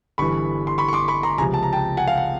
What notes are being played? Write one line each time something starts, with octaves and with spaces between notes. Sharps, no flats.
G1 G2 E3 B5 C#6
C6
B5 C#6
C#6
C6 D6
B5 C#6
A#5 C6
C#2 C3 F3 G#5 A#5
A5
A#5
G5 A5
F#5 G#5
F5
F#5